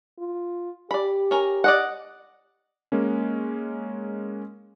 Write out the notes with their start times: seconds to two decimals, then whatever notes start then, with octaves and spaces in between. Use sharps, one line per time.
0.19 F4
0.91 G4 D5 B5
1.31 C#4 A#4
1.64 D5 D#5 F#5
2.92 G#3 A#3 C#4